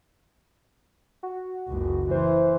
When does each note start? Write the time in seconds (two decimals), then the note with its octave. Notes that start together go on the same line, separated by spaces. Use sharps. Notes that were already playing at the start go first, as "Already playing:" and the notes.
1.23 F#4
1.69 F#1 C#2
2.11 E3 C5